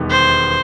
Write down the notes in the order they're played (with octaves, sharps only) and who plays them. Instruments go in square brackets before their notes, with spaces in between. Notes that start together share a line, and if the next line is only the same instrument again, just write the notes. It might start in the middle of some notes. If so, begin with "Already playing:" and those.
Already playing: [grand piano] E1 D#2 D#3 G3 B3
[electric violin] C5